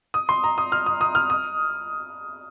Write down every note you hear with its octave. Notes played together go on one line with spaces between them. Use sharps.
D#6
C6
A#5
D#6
F6
D#6
D#6
F6
D#6